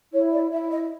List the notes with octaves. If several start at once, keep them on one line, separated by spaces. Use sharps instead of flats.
E4 C#5
D5
E4 E5
D#5